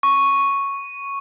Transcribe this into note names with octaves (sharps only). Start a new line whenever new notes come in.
C#6